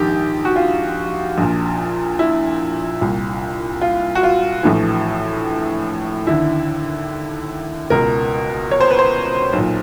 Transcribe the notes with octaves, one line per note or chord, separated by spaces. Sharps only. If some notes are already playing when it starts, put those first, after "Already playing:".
Already playing: A#1 G#2 D#3 G4
F#4
F4
A#1 A#2
E4
C2 A#2
F4
F#4
F4
A#1 A2 E3
D#2 D3 E4
C#2 B2 A#4
C#5
C5
B4
C5
B1
A#2